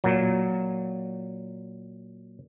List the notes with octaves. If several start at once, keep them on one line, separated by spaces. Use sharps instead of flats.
A#2 F#3